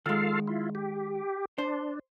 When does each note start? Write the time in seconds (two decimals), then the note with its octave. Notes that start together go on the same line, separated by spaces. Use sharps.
0.06 D#3 G#3 F4 A4 F5
0.47 E4 F4
0.75 G4
1.58 D4 C5